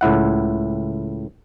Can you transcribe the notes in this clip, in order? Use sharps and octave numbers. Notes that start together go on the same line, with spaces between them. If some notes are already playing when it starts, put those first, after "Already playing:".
C#2 A2 E4 F#5